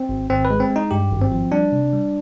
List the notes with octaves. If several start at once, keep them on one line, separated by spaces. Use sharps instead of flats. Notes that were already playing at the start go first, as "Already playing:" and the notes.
Already playing: C4
G#1
G#1 C4
B4
G#3
C4
G#3
D#4
G2 G4
G#1
C4
F3
G3 D4
C3
G3